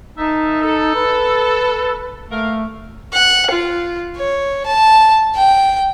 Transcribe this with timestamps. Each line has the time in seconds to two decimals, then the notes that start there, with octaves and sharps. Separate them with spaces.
0.18 D#4 A#4 E5 A5
0.61 A4
0.95 B4
2.31 A3 A#3 A#4 F5
3.13 F#5
3.52 F4
4.17 C#5
4.66 A5
5.35 G5